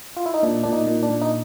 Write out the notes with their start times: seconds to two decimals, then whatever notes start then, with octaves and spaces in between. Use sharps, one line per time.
0.16 F4
0.26 E4
0.34 D#4
0.43 A#2 D4
0.63 A#2 D4
0.73 D#4
0.87 A#2
1.03 D4
1.10 A#2
1.21 D#4